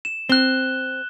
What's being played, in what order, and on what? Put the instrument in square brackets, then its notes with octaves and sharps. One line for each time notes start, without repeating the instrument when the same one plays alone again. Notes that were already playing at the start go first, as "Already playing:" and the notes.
[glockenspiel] E7
[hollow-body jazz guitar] C4 [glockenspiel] F#6 G7